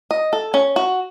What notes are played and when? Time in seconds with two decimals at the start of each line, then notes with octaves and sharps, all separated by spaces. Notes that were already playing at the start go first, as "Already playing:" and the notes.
0.11 D#5
0.33 A4
0.54 C#4
0.76 F#4